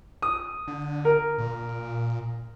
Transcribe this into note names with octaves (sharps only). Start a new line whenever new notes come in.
D#6
D3
A#4
A#2